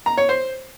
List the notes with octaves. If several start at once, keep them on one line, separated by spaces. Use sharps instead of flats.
A#5
C#5
C5